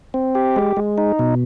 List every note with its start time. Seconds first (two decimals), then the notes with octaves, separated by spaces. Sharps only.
0.14 C4
0.35 G4
0.56 G#3
0.77 G#3
0.98 D#4
1.19 B2